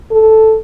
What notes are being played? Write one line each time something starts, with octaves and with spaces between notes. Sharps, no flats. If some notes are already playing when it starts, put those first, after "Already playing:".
A4